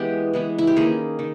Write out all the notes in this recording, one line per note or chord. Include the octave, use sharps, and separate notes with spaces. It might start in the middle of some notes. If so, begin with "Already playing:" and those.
Already playing: E3 G#3 B3 G4
E3 G#3 B3
E4
G4
D#3 A#3 C#4 G#4
D#3